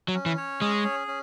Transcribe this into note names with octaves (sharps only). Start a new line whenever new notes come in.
F#3
C#4
E3
C#5
G#3 G#4
C#4
C#4